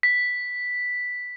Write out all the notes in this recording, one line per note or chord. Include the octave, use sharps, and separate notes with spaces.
B6